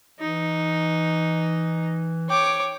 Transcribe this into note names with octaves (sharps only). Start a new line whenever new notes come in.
E3 D#4
C#5 G5 D6